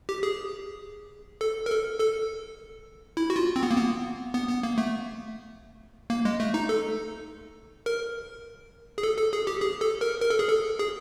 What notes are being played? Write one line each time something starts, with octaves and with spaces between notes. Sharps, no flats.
G4
G#4
A4
A#4
A4
A4
E4
F#4
F4
C4
B3
A#3
B3
B3
B3
A#3
A3
A#3
G#3
A3
D#4
A4
A#4
G#4
A4
A4
G#4
G4
G#4
A4
A#4
A#4
A4
G#4
A4
G#4